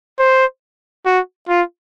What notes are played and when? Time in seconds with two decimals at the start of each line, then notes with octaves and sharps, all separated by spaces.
0.19 C5
1.06 F#4
1.49 F4